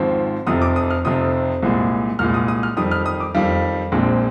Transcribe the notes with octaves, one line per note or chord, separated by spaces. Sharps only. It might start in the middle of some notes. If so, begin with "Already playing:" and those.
Already playing: G#1 G#2 F3 C4
F1 F2 C3 F3 C4 D#6
D6
D#6
F6
F1 F2 C3 F3 C4 D#6
C2 A#2 G#3
C2 A#2 G#3 F6
D#6
D#6
F6
F2 D#3 G3 D#6
F6
D#6
D6
F2 D#3 G3 F5
A#1 A#2 G#3 C4